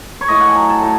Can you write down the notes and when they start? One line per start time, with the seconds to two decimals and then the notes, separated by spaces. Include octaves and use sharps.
0.21 C#5
0.28 A2 D#5
0.41 F#5
0.49 G#5
0.55 F#3
0.69 A5
0.82 A2